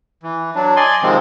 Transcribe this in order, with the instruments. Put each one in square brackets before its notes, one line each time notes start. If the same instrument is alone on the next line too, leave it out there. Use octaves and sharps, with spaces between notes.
[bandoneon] E3
F#3 D4
D5 D#5 G#5 C6
C3 D#3 F3 G#3 C4